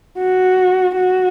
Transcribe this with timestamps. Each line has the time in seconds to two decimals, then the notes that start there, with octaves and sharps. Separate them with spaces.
0.18 F#4
0.96 F#4